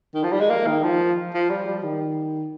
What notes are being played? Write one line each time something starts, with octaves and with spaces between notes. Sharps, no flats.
D#3
F3
G3
G#3
A#3
D#3
F3
F3
G3
G3
D#3